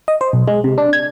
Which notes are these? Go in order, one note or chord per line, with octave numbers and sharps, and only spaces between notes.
D#5
C5
B1
G#3
C3
D4
G#6